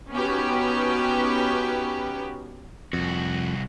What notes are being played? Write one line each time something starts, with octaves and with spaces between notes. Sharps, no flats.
B3 C#4 D#4 F#4 G4 B4
C2 F2 F#4